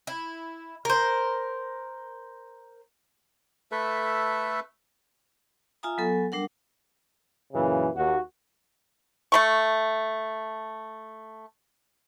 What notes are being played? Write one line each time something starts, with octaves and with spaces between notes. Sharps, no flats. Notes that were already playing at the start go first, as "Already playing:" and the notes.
E4
A#4 C5
A3 A4 B4 E5
F4 E5 F5 G#5 A#5 D#6
F#3 B3 A4 G#5
G3 D4 A#4 F#5
F#2 A#2 C#3 E3
D#2 F#4
A3 B5 C#6